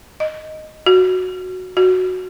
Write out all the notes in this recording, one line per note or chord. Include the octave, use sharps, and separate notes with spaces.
D#5
F#4
F#4